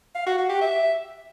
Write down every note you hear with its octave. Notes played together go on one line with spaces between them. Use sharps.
F5
F#4
F#4
G4
E5